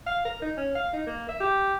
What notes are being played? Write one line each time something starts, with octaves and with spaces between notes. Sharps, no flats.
F5
A#4
D#4
C#4
F5
D#4
A#3
E5
G4